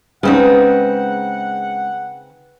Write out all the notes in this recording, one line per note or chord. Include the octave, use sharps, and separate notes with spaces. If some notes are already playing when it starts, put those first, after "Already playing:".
C#3 G#3 C4 C#4 D#4 B4 F#5